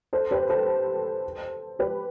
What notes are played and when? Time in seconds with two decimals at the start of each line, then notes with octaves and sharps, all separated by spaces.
0.13 A4 C5
0.31 G4 B4
0.49 A4 C5
1.79 G4 B4